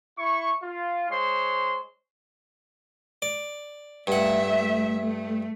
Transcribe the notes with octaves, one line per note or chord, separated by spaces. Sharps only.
E4 C#6
F4
G#3 C5 C#5 C6
D5
G2 A3 E5 F#5
A3